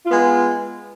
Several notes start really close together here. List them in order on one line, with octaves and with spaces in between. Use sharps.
F4 B3 G#3